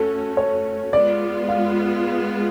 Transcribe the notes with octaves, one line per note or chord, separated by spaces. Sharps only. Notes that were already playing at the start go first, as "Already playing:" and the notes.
Already playing: A3 C#4 F#4 A4
C#5
G#3 B3 F4 D5
F5